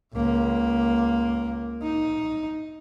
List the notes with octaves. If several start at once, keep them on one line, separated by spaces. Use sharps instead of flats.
C#2 A#3
D#4